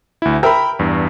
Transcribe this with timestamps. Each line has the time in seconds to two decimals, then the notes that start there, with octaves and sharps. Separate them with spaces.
0.22 D2 E4
0.43 A#4 E5 G5 B5
0.79 E2 G2